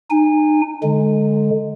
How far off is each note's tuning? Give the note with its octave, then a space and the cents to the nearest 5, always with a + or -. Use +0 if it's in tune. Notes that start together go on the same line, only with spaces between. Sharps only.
D#4 -30 G#5 -25
D3 +0 G#3 +5